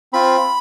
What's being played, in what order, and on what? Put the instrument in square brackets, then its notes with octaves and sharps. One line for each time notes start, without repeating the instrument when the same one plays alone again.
[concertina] C4 F4 B5